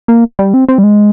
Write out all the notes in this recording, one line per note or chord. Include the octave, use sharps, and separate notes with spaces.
A#3
G3
C4
C4
G3
G#3